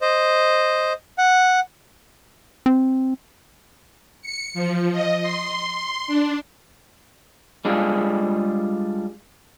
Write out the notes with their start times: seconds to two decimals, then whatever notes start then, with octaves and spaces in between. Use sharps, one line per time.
0.01 C5 D#5
1.18 F#5
2.66 C4
4.22 C#7
4.54 F3
4.92 D#5
5.22 C6
5.72 C6
6.07 D4
7.65 G3 G#3 D4 F4 G#4